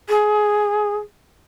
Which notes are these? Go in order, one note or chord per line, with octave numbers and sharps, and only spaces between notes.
G#4